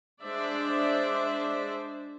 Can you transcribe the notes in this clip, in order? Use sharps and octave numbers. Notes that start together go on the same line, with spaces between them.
G#3 D4 C5 D5 E5